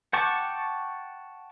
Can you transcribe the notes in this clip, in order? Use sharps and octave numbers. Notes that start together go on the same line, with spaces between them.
F#5 G5 A5 C#6 D6